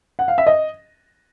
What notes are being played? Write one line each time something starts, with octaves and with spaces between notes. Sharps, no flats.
F#5
F5
E5
D#5